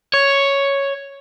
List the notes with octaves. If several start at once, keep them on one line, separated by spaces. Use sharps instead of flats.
C#5